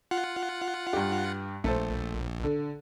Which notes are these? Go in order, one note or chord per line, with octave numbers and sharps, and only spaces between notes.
F4 F#5
G2 G4
A#1 A3 A4 C5
D3